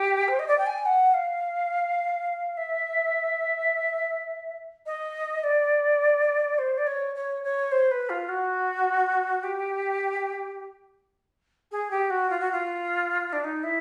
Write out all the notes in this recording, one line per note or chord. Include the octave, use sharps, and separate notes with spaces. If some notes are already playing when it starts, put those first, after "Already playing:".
Already playing: G4
C5
D#5
D5
G5
G#5
F#5
F5
E5
D#5
D5
C5
D5
C#5
C#5
C#5
C5
B4
F4
F#4
G4
G#4
G4
F#4
F4
F#4
F4
D4
D#4
E4